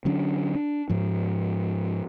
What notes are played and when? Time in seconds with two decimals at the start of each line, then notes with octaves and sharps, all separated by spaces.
0.05 D3 F#3 C#4 D4
0.55 D4
0.90 G#2 F3